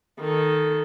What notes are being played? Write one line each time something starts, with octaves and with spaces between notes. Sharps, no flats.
D#3 A4